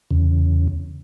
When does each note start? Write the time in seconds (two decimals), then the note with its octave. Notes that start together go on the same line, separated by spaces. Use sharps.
0.11 E2 C#3